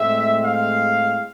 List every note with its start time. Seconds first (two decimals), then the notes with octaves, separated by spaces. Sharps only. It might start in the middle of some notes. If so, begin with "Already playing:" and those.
Already playing: A2 G#3 C4 E5
0.43 F5